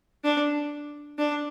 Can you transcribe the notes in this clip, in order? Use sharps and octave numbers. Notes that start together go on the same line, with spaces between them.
D4
D4